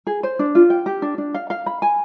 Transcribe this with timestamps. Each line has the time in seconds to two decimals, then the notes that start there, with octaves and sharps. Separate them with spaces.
0.07 G#4
0.23 C5
0.39 D4
0.55 F4
0.70 G5
0.86 G4
1.02 D4
1.18 D4
1.34 F5
1.50 F5
1.66 B5
1.82 G#5